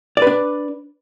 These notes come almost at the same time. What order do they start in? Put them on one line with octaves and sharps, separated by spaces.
D5 B4 D4